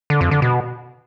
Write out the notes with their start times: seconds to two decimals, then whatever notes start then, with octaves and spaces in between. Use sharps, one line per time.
0.10 D3
0.21 F2
0.31 D3
0.42 B2